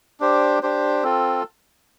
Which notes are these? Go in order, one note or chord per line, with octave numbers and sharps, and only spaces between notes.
D4 G4 C5
D4 G4 C5
C4 F4 A4